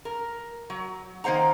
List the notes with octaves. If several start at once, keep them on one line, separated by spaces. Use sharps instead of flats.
A#4
F#3
D#3 A#3 C5 F#5 A#5